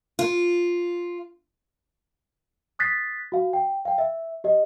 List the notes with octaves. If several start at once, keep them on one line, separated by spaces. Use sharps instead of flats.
F4
D#6 F#6 A6 B6 C7
F#4 F5
G5
F5 G5
E5
G4 D#5